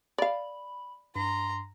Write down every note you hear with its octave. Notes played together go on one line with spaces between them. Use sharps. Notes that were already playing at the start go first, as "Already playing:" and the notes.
D5 F5 B5
G2 A#5 C6